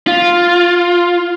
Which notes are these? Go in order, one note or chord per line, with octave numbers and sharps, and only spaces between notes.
F4